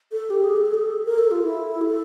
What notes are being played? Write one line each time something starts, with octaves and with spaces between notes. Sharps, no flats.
A4
G4
G#4
A4
G#4
A4
A#4
A4
F4
E4
A4